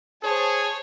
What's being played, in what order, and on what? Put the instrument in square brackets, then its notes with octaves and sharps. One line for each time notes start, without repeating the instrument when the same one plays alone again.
[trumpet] G#4 [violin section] C5 C#5 A5